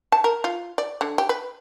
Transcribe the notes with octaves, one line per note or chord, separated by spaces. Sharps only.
A5
A#4
F4
D5
D3
G4
B4